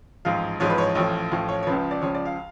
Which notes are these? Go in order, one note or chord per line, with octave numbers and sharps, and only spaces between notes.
A1 G#2 F3 F5
A1 G#2 F3 C#5
B4
C#5
A1 A2 F3 C#5
A1 A2 F3
C#5
C#5
C#2 C#3 F3 B4
D5
C#2 C#3 F3 C#5
D5
F5